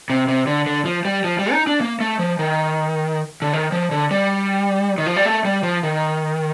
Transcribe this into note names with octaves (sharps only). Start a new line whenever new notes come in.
C3
C3
D3
D3
F3
G3
F3
G3
D#4
D4
A#3
A3
F3
D#3
D3
D#3
F3
D3
G3
D#3
F3
G3
A3
G3
F3
D#3